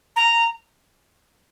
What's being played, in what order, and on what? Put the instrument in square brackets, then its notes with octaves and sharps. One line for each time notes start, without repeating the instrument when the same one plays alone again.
[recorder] A#5